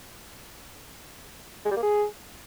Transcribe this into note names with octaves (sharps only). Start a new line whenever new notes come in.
G#3
G3
A#3
G#4